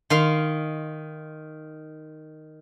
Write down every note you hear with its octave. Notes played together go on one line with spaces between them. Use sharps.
D#3 F5 C6